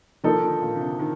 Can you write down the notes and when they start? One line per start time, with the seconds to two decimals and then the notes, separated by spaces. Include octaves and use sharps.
0.24 D#3 F3 A#3 D#4 A4
0.35 D#3
0.43 D3
0.62 A#2
0.75 D3
0.81 C3
0.99 D#3